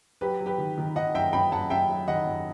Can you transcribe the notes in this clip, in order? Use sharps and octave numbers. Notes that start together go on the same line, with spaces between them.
F#3 G4 B4
F#3
G4 B4
D#3
D#3
D#3 D#5 F#5
F#2 E5 G5
F#2 G5 B5
F#2 F#5 A5
F#2 E5 G5
F#3
D#3 D#5 F#5
F#2